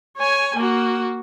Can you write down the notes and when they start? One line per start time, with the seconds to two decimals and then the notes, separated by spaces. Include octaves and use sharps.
0.17 C#5 G#5
0.56 A#3 F#4